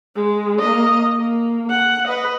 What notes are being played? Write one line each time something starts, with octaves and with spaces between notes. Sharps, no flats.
G#3
A#3 D#5
A#3
F#5
B4 D#5